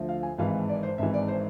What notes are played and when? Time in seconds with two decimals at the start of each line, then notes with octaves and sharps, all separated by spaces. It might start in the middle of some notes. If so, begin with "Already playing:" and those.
Already playing: D2 D3 F3
0.09 F5
0.23 G#5
0.38 G#1 G#2 E3 F5
0.69 D5
0.83 C5
0.98 G#1 G#2 E3 E5
1.14 D5
1.28 C5